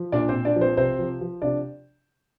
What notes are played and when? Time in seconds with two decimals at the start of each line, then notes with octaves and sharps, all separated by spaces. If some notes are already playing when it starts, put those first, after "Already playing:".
Already playing: F3
0.12 A#2 D4 D5
0.29 C4 C5
0.35 A#2
0.45 D4 D5
0.56 F3
0.61 C4 C5
0.77 C3 C4 C5
0.99 F3
1.21 F3
1.42 C3 D4 D5